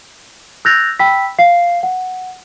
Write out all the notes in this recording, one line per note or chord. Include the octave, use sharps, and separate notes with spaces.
E6 F#6 G6 A6 A#6 F7
G5 B5 E6 B6
F5 C7
F#5